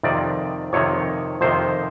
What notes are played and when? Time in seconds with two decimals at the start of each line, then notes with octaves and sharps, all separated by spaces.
0.03 F2 C3 D#3 D5
0.73 F2 C3 D#3 C#5
1.41 F2 C3 D#3 C5